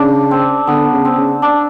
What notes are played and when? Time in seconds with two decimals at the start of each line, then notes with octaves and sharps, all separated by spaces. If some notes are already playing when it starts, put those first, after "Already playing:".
Already playing: C#3 D4
0.31 C4
0.67 D3 B3
0.93 C#3
1.05 C4
1.17 C#3
1.42 D4